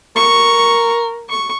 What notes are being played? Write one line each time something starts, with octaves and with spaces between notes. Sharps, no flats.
A#4 C#6
C#6